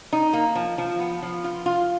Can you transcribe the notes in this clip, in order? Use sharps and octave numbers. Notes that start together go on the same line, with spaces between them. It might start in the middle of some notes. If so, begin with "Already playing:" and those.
D#4
A#3
F3
F3
B3
F3
F4
F4